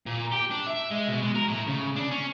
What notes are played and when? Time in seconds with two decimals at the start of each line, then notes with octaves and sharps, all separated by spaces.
0.06 A#2
0.32 G4
0.51 D4
0.67 E5
0.91 G#3
1.08 B2
1.22 G#3
1.35 A#4
1.48 A2
1.67 C#3
1.96 D4
2.11 C#4